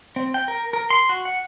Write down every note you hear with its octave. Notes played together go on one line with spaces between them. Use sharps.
C4
G5
A#4
A#4
C6
F#4
F#5